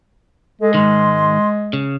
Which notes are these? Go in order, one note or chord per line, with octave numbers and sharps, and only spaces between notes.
G#3 A4
G#2 D#3 C6
C#3